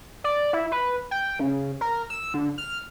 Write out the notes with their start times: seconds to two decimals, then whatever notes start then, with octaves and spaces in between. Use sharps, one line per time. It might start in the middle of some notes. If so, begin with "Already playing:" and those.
0.24 D5
0.53 E4
0.72 B4
1.11 G5
1.39 C#3
1.81 A#4
2.10 E6
2.34 D3
2.58 F6